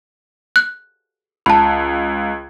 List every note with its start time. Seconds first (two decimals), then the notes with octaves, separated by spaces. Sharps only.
0.56 F#6
1.46 C#2 A5 B5